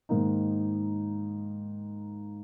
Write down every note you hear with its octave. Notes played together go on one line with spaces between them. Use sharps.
G#2 D#3 A#3 D#4